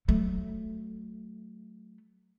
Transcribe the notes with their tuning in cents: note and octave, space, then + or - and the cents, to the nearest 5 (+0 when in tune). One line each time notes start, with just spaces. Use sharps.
F#3 +15 A3 +0